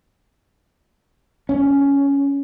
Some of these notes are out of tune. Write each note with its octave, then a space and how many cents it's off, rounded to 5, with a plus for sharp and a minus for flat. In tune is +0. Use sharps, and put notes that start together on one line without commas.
C#4 +10